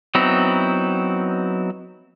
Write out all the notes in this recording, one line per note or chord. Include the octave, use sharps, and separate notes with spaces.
F#3 B3 C4 D#4 E4